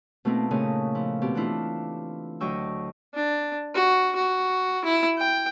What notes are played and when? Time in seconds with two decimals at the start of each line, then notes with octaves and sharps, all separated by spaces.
0.25 B2 A3 A#3 C4 D#4 E4
0.51 A#2 C#3 A3 D#6
0.95 F3 E4
1.22 B2 C4 G4
1.35 E3 A3 D4 E4 F4
2.40 D2 F#3 D#5 G5 C#6 E6
3.15 D4
3.75 F#4
4.16 F#4
4.85 E4
5.18 G5